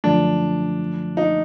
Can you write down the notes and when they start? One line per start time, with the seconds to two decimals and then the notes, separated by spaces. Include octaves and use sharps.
0.04 F#2 D3 F3 A3 D4
1.17 D#4